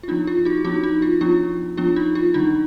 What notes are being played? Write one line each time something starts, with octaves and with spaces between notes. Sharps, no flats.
F4
F3 B3 D4 D#4
F4
D#4 F#4
F3 B3 D4 D#4 F#4
D#4
F4
F3 B3 D4 F4
F3 B3 D4 F4
D#4
F4
D3 F#3 D4 D#4